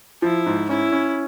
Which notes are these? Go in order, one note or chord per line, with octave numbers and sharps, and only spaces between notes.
F3 E4
G#2
C#4 E4
C#4